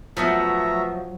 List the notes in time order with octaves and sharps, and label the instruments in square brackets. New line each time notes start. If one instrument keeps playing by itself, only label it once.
[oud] F3 [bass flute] F#3 [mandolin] A3 B3 F#4 [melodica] E5 A#5